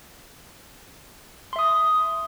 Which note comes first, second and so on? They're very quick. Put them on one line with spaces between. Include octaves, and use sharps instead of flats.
C6 E5 D#6